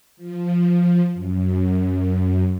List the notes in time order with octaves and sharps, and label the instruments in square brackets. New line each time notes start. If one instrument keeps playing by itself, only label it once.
[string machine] F3
F#2